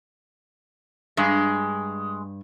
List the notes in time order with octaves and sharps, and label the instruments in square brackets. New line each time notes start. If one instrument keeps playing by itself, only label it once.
[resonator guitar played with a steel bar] G2 [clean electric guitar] G#3 G#4